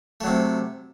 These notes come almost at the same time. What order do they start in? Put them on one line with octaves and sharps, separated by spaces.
A3 F#3 C3